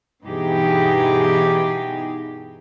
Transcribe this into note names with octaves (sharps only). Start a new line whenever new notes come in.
G2 B2 E3 D#4 G4 G#4